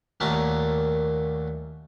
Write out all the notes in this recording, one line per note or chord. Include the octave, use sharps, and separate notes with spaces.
D#2 A#2 F#3 A3 A#4 A5